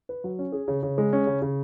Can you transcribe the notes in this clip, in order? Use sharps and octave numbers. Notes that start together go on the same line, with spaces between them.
B4
F#3
C#4
G#4
C#3
C#3
G#3
C#4
C#3
C#3